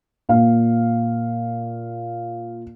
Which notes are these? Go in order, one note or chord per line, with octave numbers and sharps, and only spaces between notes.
A#2 F5